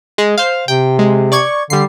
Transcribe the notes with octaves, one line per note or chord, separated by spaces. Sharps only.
G#3
C5 F5
C3 G5
G#3
D5 C#6 G#6
D3 G3 C7